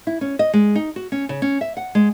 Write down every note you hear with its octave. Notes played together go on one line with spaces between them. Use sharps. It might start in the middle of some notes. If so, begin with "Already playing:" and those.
E4
C#4
D#5
G#3
D#4
F#4
C#4
C#3
C#4
E5
F#5
G#3